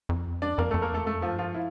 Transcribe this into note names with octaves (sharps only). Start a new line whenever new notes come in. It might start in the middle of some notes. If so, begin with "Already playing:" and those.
F2
D4 D5
F2 A#3 A#4
F2 A3 A4
A#3 A#4
E2 A3 A4
F2 A3 A4
F3 F4
G2
F3 F4
E4